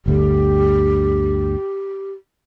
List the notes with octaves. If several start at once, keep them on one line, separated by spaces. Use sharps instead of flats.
G1 D2 D3 G4